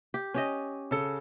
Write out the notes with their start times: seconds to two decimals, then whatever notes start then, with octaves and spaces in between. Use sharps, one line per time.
0.14 G4
0.34 C#4 G4 D#5
0.91 C#3 A4